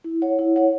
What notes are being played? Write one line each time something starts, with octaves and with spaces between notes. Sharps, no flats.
E4
C#5 F#5
E4
C#5 F#5